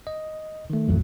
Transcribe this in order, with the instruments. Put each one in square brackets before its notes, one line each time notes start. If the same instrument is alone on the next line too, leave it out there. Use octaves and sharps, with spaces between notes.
[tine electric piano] D#5
D#3 A3
[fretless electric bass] A1 F2 F#3